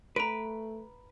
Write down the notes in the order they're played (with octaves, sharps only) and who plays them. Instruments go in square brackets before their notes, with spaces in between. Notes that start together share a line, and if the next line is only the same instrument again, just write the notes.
[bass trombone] A3 [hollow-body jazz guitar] B4 [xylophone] A#5 D7